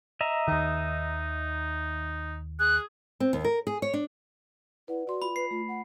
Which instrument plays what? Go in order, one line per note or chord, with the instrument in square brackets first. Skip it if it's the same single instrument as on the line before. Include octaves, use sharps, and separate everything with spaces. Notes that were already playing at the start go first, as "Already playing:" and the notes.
[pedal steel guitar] D#5 E5 A#5
[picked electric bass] D#2 D#3 [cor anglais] D#4
[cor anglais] G#4 [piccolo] F#6
[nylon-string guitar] C4
D#2
A#4
G#4
C#5
D4
[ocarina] E4 [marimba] B4 D5 F#5
[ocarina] F#4 [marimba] D5 C6
[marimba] F4 [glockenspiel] B5
[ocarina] B4 [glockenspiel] C7
[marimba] A3 [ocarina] F4
[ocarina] F#5